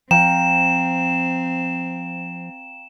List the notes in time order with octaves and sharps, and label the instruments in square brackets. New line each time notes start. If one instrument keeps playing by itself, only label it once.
[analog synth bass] F3 [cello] C4 [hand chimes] F5 G5 A#5 [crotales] E7